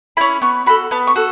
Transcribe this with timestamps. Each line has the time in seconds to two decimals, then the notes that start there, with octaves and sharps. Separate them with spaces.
0.17 C#4 E4 B5
0.42 B3 C#6
0.66 F#4 A4 B5
0.91 B3 A5
1.07 C#6
1.16 F#4 A4